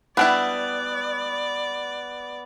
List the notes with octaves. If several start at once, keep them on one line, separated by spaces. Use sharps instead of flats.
G3 B3 D4 E4 D5